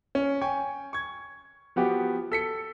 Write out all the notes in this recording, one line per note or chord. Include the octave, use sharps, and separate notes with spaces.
C#4
G5 G#5 C#6
C#6 G#6
F3 B3 F#4 G4
A4 B6 C#7